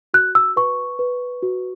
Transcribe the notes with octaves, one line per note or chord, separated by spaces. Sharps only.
F#4 F#6
E6
B4 C#6
B4
F#4